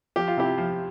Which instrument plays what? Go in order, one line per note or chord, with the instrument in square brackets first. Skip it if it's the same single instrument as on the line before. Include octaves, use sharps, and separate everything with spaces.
[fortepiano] F3 G4
F4
C3 E4 G4
F3